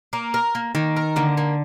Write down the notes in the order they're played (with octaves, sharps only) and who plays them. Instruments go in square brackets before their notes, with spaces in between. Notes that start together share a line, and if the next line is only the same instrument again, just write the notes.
[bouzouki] A#3
A#4
A#3
[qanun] D#3 [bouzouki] A#3
[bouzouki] A#4
[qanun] D3 [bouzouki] A#3
[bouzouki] A#3